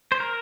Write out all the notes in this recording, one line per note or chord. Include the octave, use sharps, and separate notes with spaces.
C5
A#4